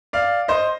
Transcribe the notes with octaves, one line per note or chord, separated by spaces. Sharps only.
D5 F5
C5 D#5